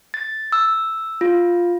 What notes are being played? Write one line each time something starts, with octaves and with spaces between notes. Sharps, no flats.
A6
E6
F4